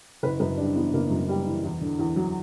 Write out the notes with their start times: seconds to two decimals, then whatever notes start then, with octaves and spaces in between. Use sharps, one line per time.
0.23 F#1 B4
0.40 F#2 B4
0.57 G3 D4
0.76 E3 B3
0.93 F#1 A#3
1.11 F#2
1.29 G3
1.46 E3
1.64 E2
1.81 D3
1.99 E2
2.16 F#3